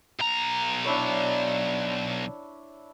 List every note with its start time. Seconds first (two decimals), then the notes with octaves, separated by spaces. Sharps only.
0.20 B1 A#5
0.84 D4 E4 C#5